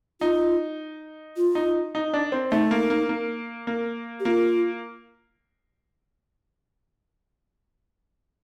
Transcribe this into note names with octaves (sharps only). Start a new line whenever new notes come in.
D#4 F4
F4
D#4
D#4
D4
C4
A3 D#4
A#3
A#3
A#3
A#3
G4
A#3 F4